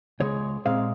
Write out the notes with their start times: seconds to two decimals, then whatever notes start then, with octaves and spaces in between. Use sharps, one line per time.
0.20 C#2 C#3 G#3 C#5
0.65 A#2 G#3 C4 F5